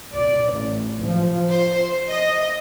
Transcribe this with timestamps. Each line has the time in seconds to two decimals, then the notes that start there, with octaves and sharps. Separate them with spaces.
0.15 D5
0.54 A1
1.02 F3
1.51 C5
2.10 D#5